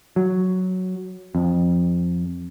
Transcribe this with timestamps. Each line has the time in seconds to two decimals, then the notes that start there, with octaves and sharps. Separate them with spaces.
0.16 F#3
1.35 F2